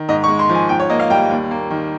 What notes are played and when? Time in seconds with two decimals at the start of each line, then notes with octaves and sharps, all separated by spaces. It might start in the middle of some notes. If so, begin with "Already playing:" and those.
Already playing: D#3
0.09 G#2 D#5
0.24 C#6
0.29 G#3
0.39 C6
0.49 F3
0.55 G#5
0.69 G#2 G5
0.80 C#5
0.90 A#3 D#5
1.00 F5
1.10 G3 G5
1.30 D#2
1.51 A#3
1.70 D#3